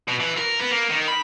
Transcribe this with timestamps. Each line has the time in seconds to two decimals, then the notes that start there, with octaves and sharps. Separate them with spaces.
0.08 B2
0.20 E3
0.37 A#4
0.59 B3
0.71 A#3
0.89 D#3
1.08 B5